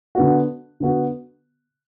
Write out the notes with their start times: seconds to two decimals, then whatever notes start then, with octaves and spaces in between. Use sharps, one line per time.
0.15 D3 B3 F#4
0.80 D3 B3 F#4